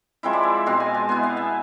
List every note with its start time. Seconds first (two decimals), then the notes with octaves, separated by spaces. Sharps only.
0.23 F3 G#3 C4 E4 E5
0.33 D5
0.43 E5
0.66 B2 G#3 C4 F5
0.80 G#5
0.94 A5
1.09 B2 B3 E4 G#5
1.23 F5
1.37 E5